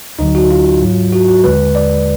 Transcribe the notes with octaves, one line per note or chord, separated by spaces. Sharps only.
D2 D3 F#3 D#4
F#4
F4
G#2 F#3
F#4
F#4
D#2 D3 G#3 B4
D5